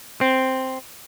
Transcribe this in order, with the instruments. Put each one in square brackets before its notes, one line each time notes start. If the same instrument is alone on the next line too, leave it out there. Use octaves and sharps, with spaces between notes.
[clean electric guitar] C4